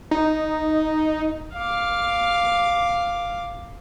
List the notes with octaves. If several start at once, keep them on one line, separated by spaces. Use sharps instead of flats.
D#4
F5 D6